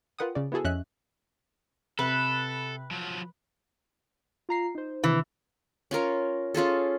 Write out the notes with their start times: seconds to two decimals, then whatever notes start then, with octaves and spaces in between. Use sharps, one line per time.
0.19 F4 A#4 B4 F#5 G5 D#6
0.35 C#3 D5
0.52 B3 E4 F#4 G#4 A4
0.64 F2 C#4 D#5 E5 F#6
1.99 C3 A4 B4
2.91 F3 F#3
4.49 F4 A#5 C7
4.75 D#4 C5
5.04 C3 D#3 E3
5.91 C#4 F4 A#4 C#5
6.54 C#4 F4 G#4 A4